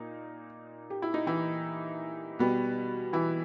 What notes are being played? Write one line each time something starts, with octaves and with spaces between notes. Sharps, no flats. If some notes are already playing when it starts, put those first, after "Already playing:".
Already playing: A#2 A#3 D#4
G4
E4
D#4
E3 E4
B2 G3 B3
E3 E4